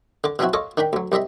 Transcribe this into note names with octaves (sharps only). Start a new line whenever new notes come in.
D3 D6
B2 F3 F#3 C4 E4 F#4
F4 A4 C#5 D#5 D6
D#3 D4 G5 B5
D2 F#3
C2 G3 D#5 E5 B5